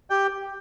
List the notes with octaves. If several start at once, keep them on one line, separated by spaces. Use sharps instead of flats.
G4 G5